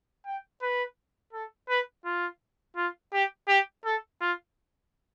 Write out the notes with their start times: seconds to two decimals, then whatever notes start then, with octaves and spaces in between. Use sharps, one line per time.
0.26 G5
0.62 B4
1.33 A4
1.69 B4
2.05 F4
2.76 F4
3.13 G4
3.48 G4
3.85 A4
4.21 F4